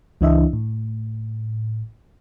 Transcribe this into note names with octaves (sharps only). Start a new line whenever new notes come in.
C#2 E3 D4 E4 D#5 E5
A2